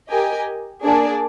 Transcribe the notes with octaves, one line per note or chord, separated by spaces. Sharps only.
G4 A#4 D#5 G#5
A#3 D4 G#4 D5